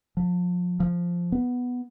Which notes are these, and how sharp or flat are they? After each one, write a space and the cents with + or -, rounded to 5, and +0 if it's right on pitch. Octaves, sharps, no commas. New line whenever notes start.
F3 +35
F3 -5
B3 +0